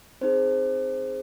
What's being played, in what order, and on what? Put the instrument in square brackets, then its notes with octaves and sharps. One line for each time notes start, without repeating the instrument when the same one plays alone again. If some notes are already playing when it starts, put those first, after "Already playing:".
[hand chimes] C4 D#4 G#4 C5